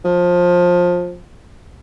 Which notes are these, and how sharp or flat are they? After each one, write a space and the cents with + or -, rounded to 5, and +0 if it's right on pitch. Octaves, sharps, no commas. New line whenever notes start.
F3 +20